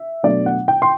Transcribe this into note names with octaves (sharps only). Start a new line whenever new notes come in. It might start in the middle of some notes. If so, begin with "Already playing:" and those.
Already playing: E5
B2 F#3 A3 D4 D5
F#5
G5
C6